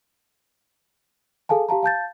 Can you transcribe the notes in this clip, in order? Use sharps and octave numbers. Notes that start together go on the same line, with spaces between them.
G#4 A4 F5 G#5 A5
G4 F5 A5 A#5
F5 A5 G6 A6